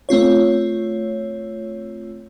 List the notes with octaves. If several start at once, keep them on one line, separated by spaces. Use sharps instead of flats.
A3 C4 F4 C#5